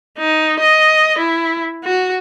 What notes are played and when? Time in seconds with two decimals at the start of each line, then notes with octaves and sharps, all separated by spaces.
0.18 D#4
0.60 D#5
1.19 E4
1.84 F#4